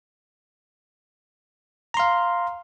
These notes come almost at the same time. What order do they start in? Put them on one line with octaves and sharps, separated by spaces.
A#5 C6 F5